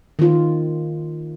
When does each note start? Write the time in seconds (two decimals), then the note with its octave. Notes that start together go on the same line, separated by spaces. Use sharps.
0.19 D#3 F4